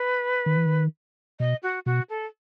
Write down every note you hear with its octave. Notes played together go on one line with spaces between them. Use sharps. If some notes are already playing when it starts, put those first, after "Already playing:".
Already playing: B4
D#3
E3
D#3
B2 D#5
F#4
B2 F#4
A4